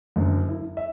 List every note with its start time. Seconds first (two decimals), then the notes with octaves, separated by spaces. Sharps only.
0.16 F#1 F#2 D3
0.49 E4
0.77 E5